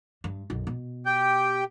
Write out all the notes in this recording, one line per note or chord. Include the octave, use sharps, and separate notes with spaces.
G2
B1 F#2
B2
G4 G5